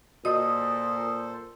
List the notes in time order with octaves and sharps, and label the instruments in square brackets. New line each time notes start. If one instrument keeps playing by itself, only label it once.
[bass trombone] A#2 [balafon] F#4 D#5 [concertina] A4 C5 [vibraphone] D#6